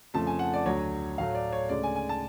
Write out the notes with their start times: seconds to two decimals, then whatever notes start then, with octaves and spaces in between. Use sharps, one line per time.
0.14 F2 C#3 F3 A3 A5
0.27 G#5
0.39 F#5
0.53 D5
0.65 D2 D3 F#3 C#5
1.18 A2 F#3 A3 F5
1.35 D5
1.52 C#5
1.69 D2 C#3 G#3 D5
1.83 G#5
1.96 G#5
2.09 A5